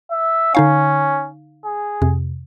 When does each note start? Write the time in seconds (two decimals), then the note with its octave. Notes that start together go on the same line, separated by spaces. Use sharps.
0.11 E5
0.55 D3 C#4 D#4 F5
1.65 G#4
2.02 F2 C3